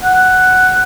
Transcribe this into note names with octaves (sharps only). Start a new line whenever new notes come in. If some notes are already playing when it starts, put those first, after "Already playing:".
F#5